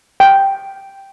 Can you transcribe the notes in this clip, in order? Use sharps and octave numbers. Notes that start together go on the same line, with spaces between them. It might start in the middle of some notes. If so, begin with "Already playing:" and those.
G5